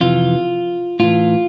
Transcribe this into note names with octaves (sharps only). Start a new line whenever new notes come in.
F2 C3 E3 F4
A2 E3 F4